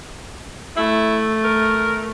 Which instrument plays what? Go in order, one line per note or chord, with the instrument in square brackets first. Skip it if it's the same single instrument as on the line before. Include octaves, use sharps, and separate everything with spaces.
[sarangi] A3 [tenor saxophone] E4
[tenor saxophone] A#4